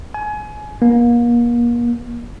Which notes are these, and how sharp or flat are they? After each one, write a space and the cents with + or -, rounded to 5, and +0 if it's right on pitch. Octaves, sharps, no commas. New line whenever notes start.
G#5 +25
A#3 +35